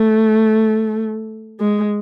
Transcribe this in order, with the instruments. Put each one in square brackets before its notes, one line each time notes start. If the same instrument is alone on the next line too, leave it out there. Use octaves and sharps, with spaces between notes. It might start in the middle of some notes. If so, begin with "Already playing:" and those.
Already playing: [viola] A3
G#3